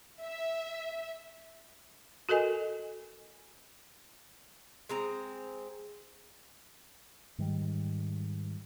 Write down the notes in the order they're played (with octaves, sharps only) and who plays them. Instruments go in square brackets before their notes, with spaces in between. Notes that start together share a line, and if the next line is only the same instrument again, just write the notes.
[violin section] E5
[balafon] F#4 A4 A#4 D#5 G#5
[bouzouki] G#3 C4 A#5
[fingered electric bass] G#2 D#3 G3